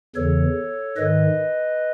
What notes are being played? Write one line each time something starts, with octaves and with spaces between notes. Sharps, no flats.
E2 C#3 E3 A4 C#5
G#2 D#3 B4 D#5